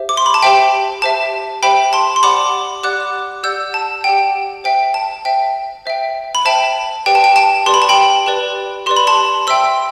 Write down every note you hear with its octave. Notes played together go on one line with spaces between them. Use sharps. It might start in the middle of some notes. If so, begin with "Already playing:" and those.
Already playing: G4 C5 E5
D6
C6
B5
A5
G4 C5 E5 G5
G4 C5 E5 A5
G4 C5 E5 G5 B5
A5 C6
C6
G4 D5 F#5 B5 D6
G4 D5 F#5 D6 F#6
G4 D5 F#5 E6 G6
A5
G4 D5 F#5 G5
C5 E5 G5
A5
C5 E5 G5
C5 E5 G5
B5
C5 E5 G5 A5
G4 B4 D5 G5
A5
G5
A5
G4 B4 D5 C6
B5
A5
G5 B5
G4 B4 D5
G4 B4 D5 C6
B5
A5 C6
C5 E5 G5 C6 E6